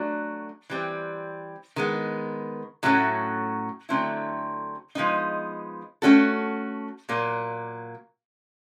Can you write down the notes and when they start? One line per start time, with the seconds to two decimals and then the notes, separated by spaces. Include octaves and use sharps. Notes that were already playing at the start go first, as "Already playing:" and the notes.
Already playing: F#3 A3 D4 F#4
0.70 E3 G3 C4
1.76 D#3 G#3 B3
2.83 A2 F#3 A3 C#4 F#4
3.89 D3 F#3 A3 C4 E4
4.95 F3 G#3 B3 D#4
6.02 A3 C#4 F#4 A4
7.09 A#2 F#3 A#3